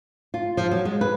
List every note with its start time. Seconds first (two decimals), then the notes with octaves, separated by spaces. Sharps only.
0.34 F4
0.57 F3
0.71 F#3
0.85 G#3
1.01 B4